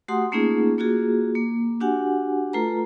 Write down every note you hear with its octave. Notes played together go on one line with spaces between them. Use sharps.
A3 F#4 G4 F#5 C6 D#6
A3 A#3 C#4 D#4 F4 G#4
A#3 F4 F#4 G#4
A#3
D4 F#4 G4 F#5 G#5
A3 F4 A4 B4 A#5